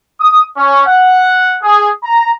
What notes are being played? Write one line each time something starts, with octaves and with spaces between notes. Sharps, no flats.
D#6
C#4
F#5
G#4
A#5